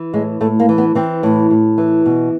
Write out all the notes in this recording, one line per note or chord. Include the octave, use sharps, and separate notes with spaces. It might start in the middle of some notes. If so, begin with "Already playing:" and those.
Already playing: E3
A2 G#3
A2 A3
A#3
E3
B3
E3 C4
A2
A2
E3
B2